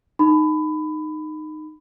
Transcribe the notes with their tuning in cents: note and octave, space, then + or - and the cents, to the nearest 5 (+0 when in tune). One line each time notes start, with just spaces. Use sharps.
D#4 -15 B5 +20